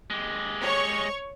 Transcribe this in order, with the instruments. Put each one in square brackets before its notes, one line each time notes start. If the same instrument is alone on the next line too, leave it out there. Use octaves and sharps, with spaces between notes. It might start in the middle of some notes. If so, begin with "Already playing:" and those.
[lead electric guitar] G#3 G4
[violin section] C#5 C#6